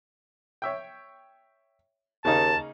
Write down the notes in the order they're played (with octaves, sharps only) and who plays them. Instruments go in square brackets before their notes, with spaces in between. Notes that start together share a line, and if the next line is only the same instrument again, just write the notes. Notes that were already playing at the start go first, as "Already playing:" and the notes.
[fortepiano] C#5 E5 G5
[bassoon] D#2 [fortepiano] C#3 A#3 D#4 [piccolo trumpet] A5